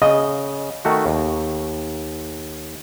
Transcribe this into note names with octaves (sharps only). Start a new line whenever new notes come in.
C#3 D#5
D#3 A3 F#4
D#2